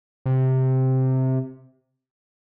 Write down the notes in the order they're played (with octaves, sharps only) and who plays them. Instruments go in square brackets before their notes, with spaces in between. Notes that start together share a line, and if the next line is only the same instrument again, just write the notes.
[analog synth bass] C3